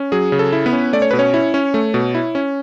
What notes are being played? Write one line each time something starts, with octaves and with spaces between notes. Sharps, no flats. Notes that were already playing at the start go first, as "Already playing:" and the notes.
Already playing: C#4
F#3 G#4
C#3
A4
E4
B3 B4
C#4
A3 D5
C#5
B2 B4
C#4 C#5
E4
C#4
A3
B2
E4
C#4